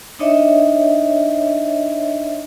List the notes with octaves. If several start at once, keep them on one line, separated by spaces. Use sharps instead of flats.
D4 D#4 C#5 D#5 E5